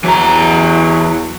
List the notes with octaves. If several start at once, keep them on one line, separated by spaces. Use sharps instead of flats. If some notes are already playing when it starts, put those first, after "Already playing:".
E2 E3 F#3 A#5